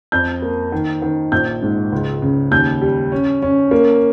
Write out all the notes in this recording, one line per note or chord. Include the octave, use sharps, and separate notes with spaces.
F2 G6
A#3
D#3
D#3
A#1 G6
G#2
C#2
C#3
D#2 G6
G3
C#4
C#4
A#3